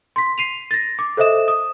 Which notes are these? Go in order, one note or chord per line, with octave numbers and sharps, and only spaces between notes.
C6 B6
C7 D#7 F7
A6 A#6
D6
A4 C5 D#5 E5 D#6 E7
D#6